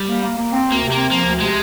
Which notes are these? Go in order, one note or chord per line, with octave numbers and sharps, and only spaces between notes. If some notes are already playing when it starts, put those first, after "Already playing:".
Already playing: G3
A#3
A#3
A#3
C4
D2
A#3
C3
A#3 C4
F3 A#3
D2
C3 G#3